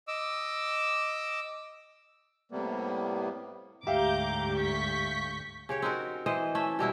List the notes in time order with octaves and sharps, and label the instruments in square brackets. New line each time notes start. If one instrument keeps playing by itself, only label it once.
[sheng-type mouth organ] D#5 D6 E6
[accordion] A2 C3 G3 A#3 B3
[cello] D2 G#2 [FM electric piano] G4 [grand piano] E5 F5 [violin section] A#5 D6 G6
[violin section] C#6 G6 B6
[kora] C#3 G4 C#5
C4 D#4 F#4 A#4
E3 C5 D#5
A3 C#4 E5
B2 G3 E4 A#4